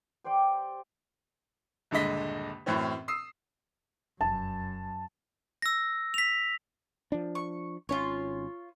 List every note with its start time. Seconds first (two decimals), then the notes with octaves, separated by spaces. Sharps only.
0.24 G4 C5 D5 G5
1.91 D#1 G2 D3 G#3 D#5 B6
2.66 F#2 A2 E3 C4 C#4
3.08 D#6 E6 C7
4.21 F1 F#2 A5
5.62 E6 A#6
6.14 B6 F7
7.12 F3 D4
7.35 C#6
7.89 G#1 C#4 F4 C#5